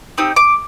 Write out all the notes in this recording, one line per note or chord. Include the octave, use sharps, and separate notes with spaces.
C4 D#4 G4 D#6
D6